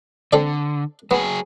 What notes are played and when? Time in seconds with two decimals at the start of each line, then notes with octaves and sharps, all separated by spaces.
0.33 D3 C4 A4 D5
1.11 F#3 B3 G#4